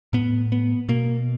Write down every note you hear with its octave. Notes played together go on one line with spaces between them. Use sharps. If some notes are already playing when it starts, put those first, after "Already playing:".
A2 B3
B3
B2 A#3